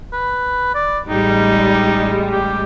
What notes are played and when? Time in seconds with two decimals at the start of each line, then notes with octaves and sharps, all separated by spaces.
0.13 B4
0.75 D5
1.09 A1 G3 G#3 D#4
2.32 G4